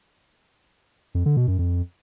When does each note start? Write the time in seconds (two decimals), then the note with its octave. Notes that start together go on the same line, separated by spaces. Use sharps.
1.15 F2
1.26 D3
1.37 B2
1.48 F#2
1.59 F2